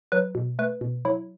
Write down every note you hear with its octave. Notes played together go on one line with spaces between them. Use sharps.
F#3 B4
B2
A3 B4
B2
F#3 E4